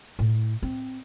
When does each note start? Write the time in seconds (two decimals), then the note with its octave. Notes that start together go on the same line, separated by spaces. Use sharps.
0.19 A2
0.62 C4